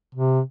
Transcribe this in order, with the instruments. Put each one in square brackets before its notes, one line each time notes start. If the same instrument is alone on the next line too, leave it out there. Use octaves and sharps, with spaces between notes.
[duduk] C3